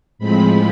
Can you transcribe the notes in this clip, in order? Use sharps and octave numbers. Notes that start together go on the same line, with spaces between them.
A2 F3 G#3 C4 B5